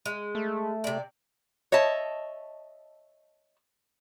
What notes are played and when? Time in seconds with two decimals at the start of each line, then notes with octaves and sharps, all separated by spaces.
0.06 G#3
0.35 A3
0.84 C3 D5
1.72 C#5 D#5 E5 A5